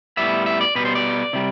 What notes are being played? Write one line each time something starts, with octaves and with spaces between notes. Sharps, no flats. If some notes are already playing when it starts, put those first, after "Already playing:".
A2 G3 B3 E5
E5
D5
B2 G3 B3 B4
C5
D5
C3 G3